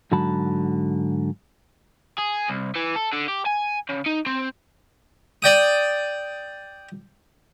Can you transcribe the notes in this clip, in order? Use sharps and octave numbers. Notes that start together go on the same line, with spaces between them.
G#2 D3 F#3 F#4 A5 B5
G#4
C2
E3
A4
D3
G4
G#5
C#3
D#4
C4
D5 G5 D#6